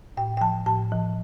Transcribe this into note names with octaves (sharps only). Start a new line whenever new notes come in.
A2 G5
G5
F3 A5
A2 A5
F3